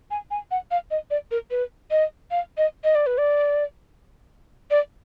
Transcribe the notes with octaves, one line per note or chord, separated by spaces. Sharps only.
G#5
G#5
F#5
F5
D#5
D5
A#4
B4
D#5
F5
D#5
D#5
D5
B4
D5
D5